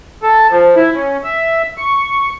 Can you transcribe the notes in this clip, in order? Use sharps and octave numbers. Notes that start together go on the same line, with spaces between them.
A4
F3
E4
C#4
E5
C#6